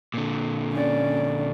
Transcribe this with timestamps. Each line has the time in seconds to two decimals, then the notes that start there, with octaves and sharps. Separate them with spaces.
0.14 A#2 D3
0.72 C#4 D5